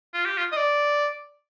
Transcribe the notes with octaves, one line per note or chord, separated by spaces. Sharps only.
F4
G4
F4
D#5
D5